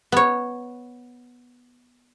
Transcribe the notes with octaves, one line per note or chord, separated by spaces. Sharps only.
B3 C#5